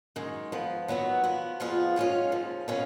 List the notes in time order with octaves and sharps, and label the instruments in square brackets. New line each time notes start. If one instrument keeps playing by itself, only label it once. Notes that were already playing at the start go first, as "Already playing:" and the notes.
[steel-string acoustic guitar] F#2 D#3 G#3
G#2 F3 B3
D#3 F#3 B3 F#4
F3 B3 F#4
F2 F3 B3 F4 G#4
F#2 D#3 G#3 C#4 F4
D#2 C#3 F3
B2 G#3 C#4 F4 G#4